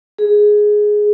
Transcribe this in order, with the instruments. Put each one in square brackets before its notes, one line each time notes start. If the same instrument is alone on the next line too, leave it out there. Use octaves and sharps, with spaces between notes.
[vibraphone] G#4